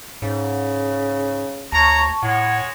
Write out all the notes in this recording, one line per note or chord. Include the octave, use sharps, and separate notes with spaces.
G#2 C#3
D2 C#5 A5 A#5 C#6
A2 G#3 C#5 F#5